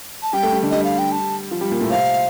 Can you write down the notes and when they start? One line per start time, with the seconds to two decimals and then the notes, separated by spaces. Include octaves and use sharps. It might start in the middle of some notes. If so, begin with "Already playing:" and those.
0.22 A5
0.33 G3 G4 G5
0.43 A3 A4
0.53 G3 G4
0.63 D3 D4
0.70 G3 G4 D#5
0.84 F5
0.99 G5
1.12 A5
1.51 F3 F4
1.61 G3 G4
1.71 A#2 A#3
1.81 A2 A3
1.90 C3 C4 F5